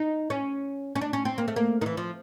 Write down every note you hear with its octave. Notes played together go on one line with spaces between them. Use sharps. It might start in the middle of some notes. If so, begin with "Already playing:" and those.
Already playing: D#4
C#4
C#4
D4
C#4
C4
A#3
A3
A#3
D#3
E3
F3